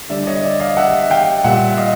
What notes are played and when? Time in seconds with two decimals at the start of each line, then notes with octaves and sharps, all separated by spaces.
0.09 D3 G3 D5 E5
0.27 C#5 D#5
0.43 D5 E5
0.60 D#5 F5
0.77 E5 F#5
1.10 F5 G5
1.44 A#2 G3 E5 F#5
1.77 D#5 F5